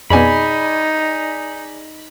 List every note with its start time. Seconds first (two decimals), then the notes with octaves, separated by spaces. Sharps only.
0.10 F2 B2 D#4 G#4 D5 G#5 B5